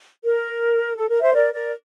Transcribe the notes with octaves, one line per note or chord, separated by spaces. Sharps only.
A#4
A4
A#4
C5 E5
A#4 D5
A#4 D5